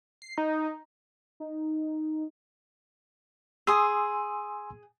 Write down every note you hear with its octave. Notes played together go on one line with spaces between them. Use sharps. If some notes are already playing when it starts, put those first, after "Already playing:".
C7
D#4
D#4
G#4 G#5 C6 D#6 E6